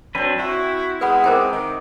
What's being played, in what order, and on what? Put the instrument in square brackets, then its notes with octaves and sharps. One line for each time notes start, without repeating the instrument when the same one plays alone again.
[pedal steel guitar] F#3 D4 B4 [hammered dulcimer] C4 C5
[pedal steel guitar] E4 [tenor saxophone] F#4
[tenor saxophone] G#3 [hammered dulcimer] B3 [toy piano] B4 F#5 B5
[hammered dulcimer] C3 D#4 D6 [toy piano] A#4 C5 G5
[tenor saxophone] D#3